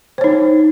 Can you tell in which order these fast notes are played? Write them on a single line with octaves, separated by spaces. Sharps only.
C5 C#5 D#4